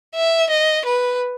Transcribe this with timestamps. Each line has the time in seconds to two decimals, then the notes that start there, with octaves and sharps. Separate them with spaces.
0.15 E5
0.50 D#5
0.85 B4